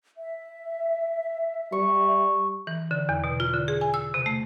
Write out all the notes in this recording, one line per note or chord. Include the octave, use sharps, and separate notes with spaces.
E5
G3 C#6
E3
D3
E2
B2
F4
D3
G#4
G#5
E6
C3
A3